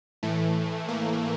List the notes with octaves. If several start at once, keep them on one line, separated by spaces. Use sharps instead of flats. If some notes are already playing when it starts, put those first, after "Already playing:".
A2 E3 A3
A#3